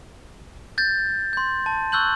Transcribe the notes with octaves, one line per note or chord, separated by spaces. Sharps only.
G6 A6
C6 G6
A5
C#6 E6 F#6 G6 F#7